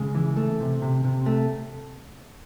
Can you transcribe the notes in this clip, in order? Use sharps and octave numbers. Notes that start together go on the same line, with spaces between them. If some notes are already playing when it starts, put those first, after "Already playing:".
Already playing: C#3 G#3
E3
A3
C3
C3
C3
A3